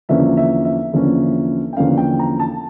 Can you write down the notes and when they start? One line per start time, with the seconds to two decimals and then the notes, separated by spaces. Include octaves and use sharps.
0.09 E2 D3 F3 A#3 C#4 E5
0.37 E5
0.65 E5
0.93 E2 D3 F3 A#3 C#4
1.73 G5
1.77 E2 D3 F3 A#3 C#4 F5
1.97 G5
2.19 A#5
2.40 A5